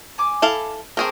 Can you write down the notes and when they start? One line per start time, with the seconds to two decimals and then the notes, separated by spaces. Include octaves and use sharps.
0.18 G#5 D6
0.42 E4 A4 F5
0.97 A3 C4 G#4 A#4 D6